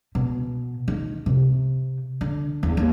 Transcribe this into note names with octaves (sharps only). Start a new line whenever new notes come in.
B2
D#3
C3
D3
E2
D#2